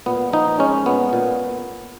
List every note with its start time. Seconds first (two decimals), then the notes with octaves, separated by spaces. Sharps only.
0.06 A#2 B3
0.33 F3 D#4
0.59 G#3 C#4
0.86 A#2 B3
1.13 A#2